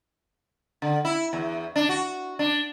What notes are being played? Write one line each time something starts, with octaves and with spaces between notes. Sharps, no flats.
D3
E4
E2
D4
F#4
D4